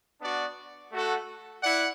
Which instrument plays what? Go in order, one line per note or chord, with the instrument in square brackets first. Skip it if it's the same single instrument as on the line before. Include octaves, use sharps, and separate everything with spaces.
[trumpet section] B3 D4 F#4 D5
A3 F#4 A4 F#5
E4 D5 F#5